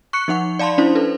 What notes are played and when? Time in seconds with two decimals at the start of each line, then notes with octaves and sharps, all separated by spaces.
0.13 C#6 F#6 C#7
0.28 F3 D#4 F#5 C#6
0.59 D5 F5 A5 B5 C6
0.78 C#4 D4 E4 C5
0.95 A4 B4